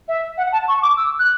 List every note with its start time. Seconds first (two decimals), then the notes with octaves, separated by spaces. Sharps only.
0.08 E5
0.38 F#5
0.52 A5
0.68 C#6
0.82 D6
0.97 E6
1.19 F#6